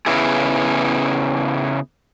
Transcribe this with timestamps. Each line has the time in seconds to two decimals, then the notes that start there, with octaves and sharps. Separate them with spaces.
0.06 C#3 B3 E4 G#4